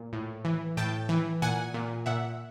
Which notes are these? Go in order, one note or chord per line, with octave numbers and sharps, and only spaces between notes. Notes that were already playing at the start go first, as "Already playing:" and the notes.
Already playing: A#2
A2
E3
A2 G5 A5
E3
A#2 F#5 G#5
A#2
A#2 E5 F#5